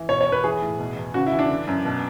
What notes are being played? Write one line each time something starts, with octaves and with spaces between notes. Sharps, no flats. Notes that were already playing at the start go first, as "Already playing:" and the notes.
Already playing: E3
B2 C#5
C#5
E2
B4
E3 G#4
A2
B2
E2
C#3 F#4
E4
E3
D4
D3
F#2
B2